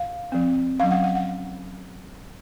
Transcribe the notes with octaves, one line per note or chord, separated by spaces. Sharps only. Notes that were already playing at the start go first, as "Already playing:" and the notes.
Already playing: F5
F3 C4
F#3 C#4 F5
F#5
F#5
F#5